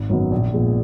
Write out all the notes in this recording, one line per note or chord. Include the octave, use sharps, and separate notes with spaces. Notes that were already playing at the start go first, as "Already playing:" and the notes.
Already playing: G#1
F#2 D#3 F#3 B3
A#1
A#2 F3 G#3 B3